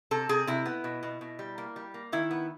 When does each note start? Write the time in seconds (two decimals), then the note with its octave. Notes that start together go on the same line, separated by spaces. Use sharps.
0.11 C3 A4
0.29 C3 G#4
0.47 C3 E4
0.66 B3
0.84 B2
1.03 B2
1.21 B2
1.39 G3
1.58 A#3
1.76 G3
1.94 A#3
2.12 D#3 E4
2.31 B3